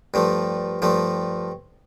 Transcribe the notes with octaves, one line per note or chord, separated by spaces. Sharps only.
G2 F3 A3
G2 F3 A3